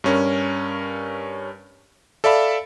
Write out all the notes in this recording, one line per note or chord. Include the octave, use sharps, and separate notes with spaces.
G2 C#4 A#4
A4 D5 E5 F5 B5